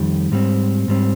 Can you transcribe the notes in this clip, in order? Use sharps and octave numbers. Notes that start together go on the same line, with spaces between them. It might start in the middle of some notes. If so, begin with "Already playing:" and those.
Already playing: F2 D#3 G3
G#2 G3 C4
G#2 G3 C4